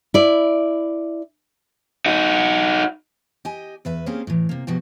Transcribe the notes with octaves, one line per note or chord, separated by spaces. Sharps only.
E4 D5
D#4 F#4
G4 D#5 G#5
E2 B4 E5
A#3 C4 C#4 G4 G#4 A#4
A2 E3
C3 A#3
B2 F3 F#4 G4